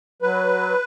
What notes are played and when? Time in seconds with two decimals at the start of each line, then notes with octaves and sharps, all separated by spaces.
0.22 F#3 B4